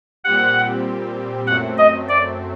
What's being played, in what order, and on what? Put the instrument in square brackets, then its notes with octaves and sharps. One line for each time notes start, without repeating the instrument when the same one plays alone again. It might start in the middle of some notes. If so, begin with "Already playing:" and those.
[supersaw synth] A#2 G3 C4 G4 [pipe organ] F#5
[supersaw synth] F#2 F#3 A3 C4 [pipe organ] F#5
[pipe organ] D#5
D5